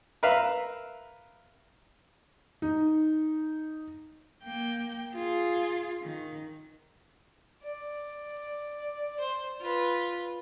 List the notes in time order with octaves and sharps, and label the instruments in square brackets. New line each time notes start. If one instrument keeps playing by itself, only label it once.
[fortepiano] A#4 B4 E5 F5
[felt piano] D#4
[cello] A#3 G5
F4 G#4
D#3
[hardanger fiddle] D5
C5
F4 B4